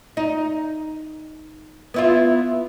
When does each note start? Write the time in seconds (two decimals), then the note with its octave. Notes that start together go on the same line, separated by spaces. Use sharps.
0.17 D#4
1.94 B3 E4 F4